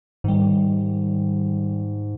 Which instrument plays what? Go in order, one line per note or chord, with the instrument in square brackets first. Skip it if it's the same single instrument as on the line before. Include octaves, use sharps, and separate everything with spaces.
[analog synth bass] G#2 [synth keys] D#3 G3